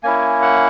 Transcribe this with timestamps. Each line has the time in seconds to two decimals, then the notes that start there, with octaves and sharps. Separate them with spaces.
0.03 A#3 C#4 E4 G#5
0.42 F#5